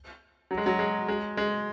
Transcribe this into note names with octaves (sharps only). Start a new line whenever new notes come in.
F#3
G#3
F#3
G#3
G#3
G#3